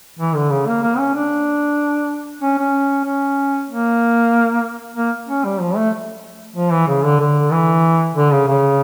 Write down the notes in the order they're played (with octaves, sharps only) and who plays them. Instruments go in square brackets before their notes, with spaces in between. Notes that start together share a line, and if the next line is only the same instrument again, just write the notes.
[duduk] E3
D3
C#3
A#3
A#3
C#4
D4
C#4
C#4
C#4
A#3
A#3
C#4
G3
F3
A3
F3
E3
C#3
D3
D3
E3
D3
C#3
C#3